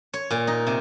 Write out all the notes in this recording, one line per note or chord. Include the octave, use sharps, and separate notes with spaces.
C#5
A#2
D#4
C3